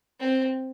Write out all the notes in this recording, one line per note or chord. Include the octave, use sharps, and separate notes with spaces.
C4